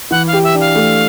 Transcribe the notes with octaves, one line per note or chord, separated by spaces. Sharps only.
E3 F#5
F5
G4
E5
D4
F5
A3